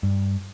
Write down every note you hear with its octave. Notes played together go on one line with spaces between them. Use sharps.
G2